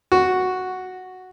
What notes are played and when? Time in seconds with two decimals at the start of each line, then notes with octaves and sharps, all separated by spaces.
0.12 F#4